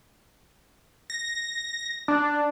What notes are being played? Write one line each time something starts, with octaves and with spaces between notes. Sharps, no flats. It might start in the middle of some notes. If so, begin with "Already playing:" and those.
A#6
D4